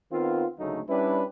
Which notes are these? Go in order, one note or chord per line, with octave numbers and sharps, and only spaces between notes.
D#3 B3 C4 F4
G#1 D2 C#3 F#3 A3 D#4
G3 C#4 D4 E4 B4